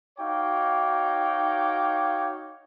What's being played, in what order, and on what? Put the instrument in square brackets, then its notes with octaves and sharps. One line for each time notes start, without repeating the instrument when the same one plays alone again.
[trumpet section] D#4 F#4 C#5 F5 G5 D6